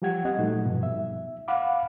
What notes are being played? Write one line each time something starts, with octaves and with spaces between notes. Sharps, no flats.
F3 G3 G4 F#5 G#6
C4 G4 D#5 F#5
A#2 F#3 A3 D#4
G2 B2 F3 G3
E5
F5 F#5 B5 D6